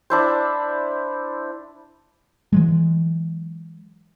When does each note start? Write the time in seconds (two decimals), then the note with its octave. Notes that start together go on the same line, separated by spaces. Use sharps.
0.10 D4 E4 C5
2.53 E3 F#3 G#3